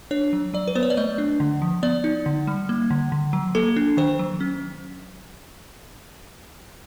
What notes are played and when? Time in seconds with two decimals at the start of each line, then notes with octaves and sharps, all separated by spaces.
0.11 D4 C#5
0.33 F#3
0.54 F#3 D5
0.68 B4
0.75 B3 C5
0.83 C#5
0.90 D5
0.97 A3 D#5
1.18 D4
1.40 D3
1.62 F3
1.83 B3 D5
2.04 D#4
2.26 D3
2.47 G3
2.69 A#3
2.90 D3
3.12 D3
3.33 F#3
3.55 A#3 A4
3.76 D4
3.97 D#3 C5
4.19 F#3
4.40 C#4